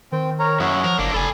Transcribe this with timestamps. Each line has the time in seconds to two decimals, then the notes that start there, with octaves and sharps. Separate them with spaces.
0.12 D#3 C4 G5
0.39 A#4 C#5 A#5
0.60 F#2 E4 C#5 F#5 D#6
0.84 F3 A#4
0.99 F#1 A#3 D4
1.14 F1 A4 D5 G#5 B5